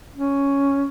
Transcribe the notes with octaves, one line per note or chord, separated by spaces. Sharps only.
C#4